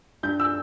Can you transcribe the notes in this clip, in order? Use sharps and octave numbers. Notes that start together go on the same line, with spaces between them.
G2 G6
E6